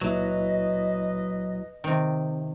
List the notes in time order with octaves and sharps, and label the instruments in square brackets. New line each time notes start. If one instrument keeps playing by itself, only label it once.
[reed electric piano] C#2 A#2 E4 [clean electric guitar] F#3 [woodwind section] B4 D#5
[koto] C3 D#3